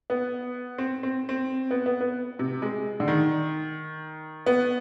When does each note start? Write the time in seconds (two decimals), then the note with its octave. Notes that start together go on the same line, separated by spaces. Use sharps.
0.10 B3
0.78 C4
1.03 C4
1.29 C4
1.71 B3
1.86 B3
2.01 B3
2.39 C3
2.62 G#3
3.00 D3
3.08 D#3
4.46 B3